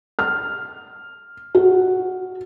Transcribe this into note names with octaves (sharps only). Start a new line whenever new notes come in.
F6
F#4